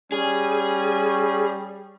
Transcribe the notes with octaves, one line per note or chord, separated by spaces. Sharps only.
G3 C#4 G#4